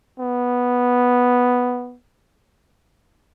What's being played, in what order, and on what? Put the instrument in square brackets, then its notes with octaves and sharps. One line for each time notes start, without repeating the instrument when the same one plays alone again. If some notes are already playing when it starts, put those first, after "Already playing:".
[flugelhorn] B3